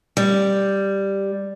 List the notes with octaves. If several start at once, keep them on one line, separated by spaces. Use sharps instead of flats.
G3